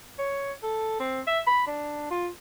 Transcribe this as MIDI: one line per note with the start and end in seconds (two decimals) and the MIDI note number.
0.19 0.52 73
0.63 0.96 69
1.00 1.21 60
1.27 1.39 76
1.47 1.64 83
1.67 2.06 62
2.10 2.28 65